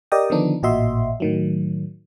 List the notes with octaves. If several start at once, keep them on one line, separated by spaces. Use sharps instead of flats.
G4 A#4 D5 D#5 G5 D#6
D3 D#3 F3 B3 D4 D#4
A1 A#2 F#4 D#5 E5 C6
A2 D#3 F#3